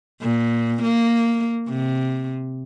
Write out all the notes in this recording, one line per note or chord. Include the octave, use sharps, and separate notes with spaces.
A#2
A#3
C3